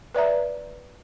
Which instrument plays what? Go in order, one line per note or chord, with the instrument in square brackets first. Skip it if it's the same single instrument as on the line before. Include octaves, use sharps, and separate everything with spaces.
[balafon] B4 D5 E5 A#5